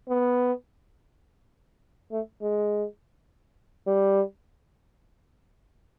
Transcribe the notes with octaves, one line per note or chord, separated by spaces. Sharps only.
B3
A3
G#3
G3